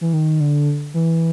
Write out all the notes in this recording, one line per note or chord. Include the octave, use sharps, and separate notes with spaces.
E3
D#3
D3
E3